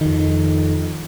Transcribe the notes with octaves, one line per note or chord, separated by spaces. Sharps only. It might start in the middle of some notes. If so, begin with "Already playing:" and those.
F2 D#3